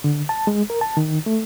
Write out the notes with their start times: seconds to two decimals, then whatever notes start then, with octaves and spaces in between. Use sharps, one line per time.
0.04 D3
0.29 A5
0.47 G#3
0.70 A#4
0.81 A5
0.97 D#3
1.26 A3